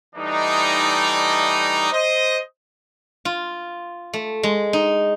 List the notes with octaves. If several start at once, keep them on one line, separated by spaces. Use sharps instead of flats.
E3 G3 A3 D4 D#4
C5 D#5
F4
A3
G#3
D#4